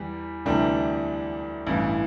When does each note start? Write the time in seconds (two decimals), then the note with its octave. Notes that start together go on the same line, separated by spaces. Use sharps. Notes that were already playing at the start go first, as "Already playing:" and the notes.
Already playing: E2 G3
0.46 D2 C3 E3 G3 D4
1.67 A1 G2 E3